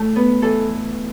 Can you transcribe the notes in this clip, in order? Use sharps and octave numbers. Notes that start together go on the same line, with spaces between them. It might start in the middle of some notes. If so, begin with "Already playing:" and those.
Already playing: E3 A3
B3
E3 A4